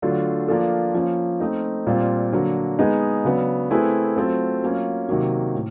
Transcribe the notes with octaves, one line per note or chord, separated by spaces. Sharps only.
D3 F#3 A3 D4 F4
F3 A#3 D4 F4 A4
F3 A#3 C#4
A3 C4 D#4
A#2 G3 C4 F4
D3 F#3 A#3
G#3 B3 D#4 G#4
C#3 F#3 B3 D4
A3 C4 E4 G#4 B4
F#3 A3 C4 F4 A4
F#3 A#3 C#4 F4
C3 D#3 F#3 A#3
A2